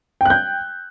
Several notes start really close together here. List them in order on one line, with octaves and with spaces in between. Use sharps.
G5 F#6 G6